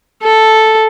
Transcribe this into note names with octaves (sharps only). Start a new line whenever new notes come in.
A4